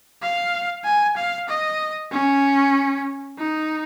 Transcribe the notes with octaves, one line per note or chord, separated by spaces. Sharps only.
F5
G#5
F5
D#5
C#4
D#4